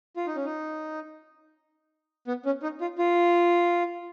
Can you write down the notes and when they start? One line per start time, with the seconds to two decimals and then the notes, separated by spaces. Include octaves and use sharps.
0.17 F4
0.27 D#4
0.36 C#4
0.45 D#4
2.28 B3
2.46 C#4
2.63 D#4
2.81 F4
2.99 F4